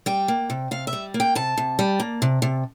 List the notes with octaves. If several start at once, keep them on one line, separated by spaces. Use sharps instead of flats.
G3 G5
A#3
C3
C3 F5
E5
G3
A#3
G5
C3 A5
C3
G3
A#3
C3
C3